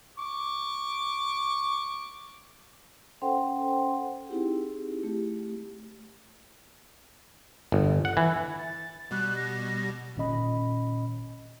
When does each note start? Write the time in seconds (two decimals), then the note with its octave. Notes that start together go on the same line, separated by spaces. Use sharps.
0.18 C#6 D6
3.22 C#4 A4 C5 F#5 G5 C6
4.29 C4 D#4 E4 G4 G#4
5.03 A3 G4
7.72 G1
8.05 F#5
8.17 E3
8.58 A6
9.11 B2 G3 F#6
9.35 A#6
10.16 G1 A#2 D#3 C#4 D#5 B5